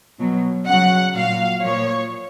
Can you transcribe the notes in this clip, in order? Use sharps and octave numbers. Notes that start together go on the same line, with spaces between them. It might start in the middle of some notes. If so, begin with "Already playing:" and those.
B2 F#3
C#3 F#3 F#5
A#2 F#3 F5
A#2 F3 C#5